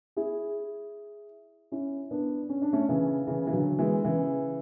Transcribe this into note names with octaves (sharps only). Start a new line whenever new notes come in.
E4 G#4
C#4 E4
B3 D4
C#4
D4
A3 C#4
C#3 E3
C#3 E3
E3
D3 F#3
E3 G#3
C#3 E3